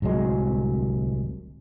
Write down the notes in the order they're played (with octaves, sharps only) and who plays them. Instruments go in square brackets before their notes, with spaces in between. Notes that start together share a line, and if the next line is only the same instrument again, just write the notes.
[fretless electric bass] D1 C2 F#3 G#3